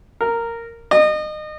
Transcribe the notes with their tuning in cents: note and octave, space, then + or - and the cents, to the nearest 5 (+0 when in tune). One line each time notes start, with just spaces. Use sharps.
A#4 -10
D#5 -30